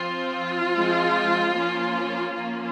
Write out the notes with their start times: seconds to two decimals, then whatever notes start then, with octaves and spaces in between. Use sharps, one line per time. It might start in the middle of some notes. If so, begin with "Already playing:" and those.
Already playing: F3 C4 F4
0.73 F3 G#3 C4
1.54 F3 A#3 C#4
2.34 F3 A#3 C#4 F4